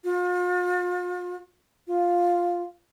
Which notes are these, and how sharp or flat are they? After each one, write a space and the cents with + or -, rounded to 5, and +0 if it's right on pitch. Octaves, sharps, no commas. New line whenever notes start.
F4 +40
F4 +5